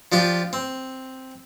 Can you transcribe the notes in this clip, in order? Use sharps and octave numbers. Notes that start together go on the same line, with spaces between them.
F3 D4 F4 G4
C4